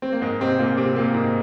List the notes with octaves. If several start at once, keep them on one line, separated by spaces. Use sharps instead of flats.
C4
A#3
G#2 G#3
C3 C4
A#2 A#3
C3 C4
A#2 A#3
G#2 G#3